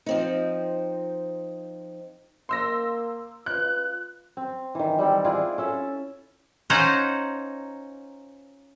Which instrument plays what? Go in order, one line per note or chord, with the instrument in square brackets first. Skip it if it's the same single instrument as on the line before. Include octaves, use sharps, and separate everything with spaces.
[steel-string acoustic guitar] F3 C4 D#4
[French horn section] A#3 [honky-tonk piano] C6 E6 A#6
[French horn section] F4 B4 [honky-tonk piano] F#6
[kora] C4
D#3 E3
G3 C4 G4 A4
E4 F4 G#4 D5
C#4 A4 E5
[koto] C#4 D#4 F4 C5 F#5 A#5